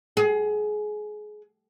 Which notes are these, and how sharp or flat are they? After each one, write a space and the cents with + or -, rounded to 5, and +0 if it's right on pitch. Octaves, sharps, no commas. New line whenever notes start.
G#4 +25